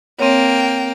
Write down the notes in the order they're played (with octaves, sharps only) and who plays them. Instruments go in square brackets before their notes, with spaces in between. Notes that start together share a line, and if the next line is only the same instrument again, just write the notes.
[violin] A#3 G5 [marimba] C4 C#5